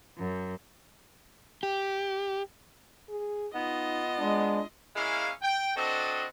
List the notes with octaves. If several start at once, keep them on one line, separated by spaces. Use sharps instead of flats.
F#2
G4
G#4
B3 D#4 F4 D#5
G#3 D4
G#3 A#3 C#4 E4 F5
G5
C4 D4 F#4 A4 D#5